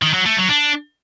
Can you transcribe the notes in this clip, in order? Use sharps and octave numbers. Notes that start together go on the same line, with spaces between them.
D#3
F#3
A3
F#3
D4